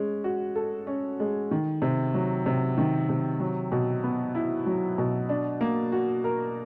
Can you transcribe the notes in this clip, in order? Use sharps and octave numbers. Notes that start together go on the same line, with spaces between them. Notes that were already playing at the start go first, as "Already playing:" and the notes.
Already playing: G#3 C#4
F#4
A4
C#4
G#3
D#3
C3
F#3
C3
D#3
C3
F#3
B2
B3
E4
F#3
B2
D4
A#3
F#4
A#4